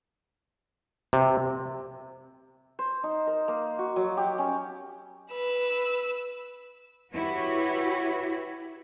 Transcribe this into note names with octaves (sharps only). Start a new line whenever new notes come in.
C3
C5
D#4
A#4
A#3
F#4
F#3
G4
C#4
B4 E6
E4 F#4 G4 B4 C#5